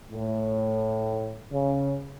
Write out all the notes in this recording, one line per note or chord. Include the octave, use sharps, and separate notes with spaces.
A2
C#3